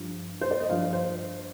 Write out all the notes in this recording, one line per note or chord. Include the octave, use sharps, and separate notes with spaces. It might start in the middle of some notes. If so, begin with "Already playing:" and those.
Already playing: G2 F3
C5
D5
D#5
G2 F3 F5
C5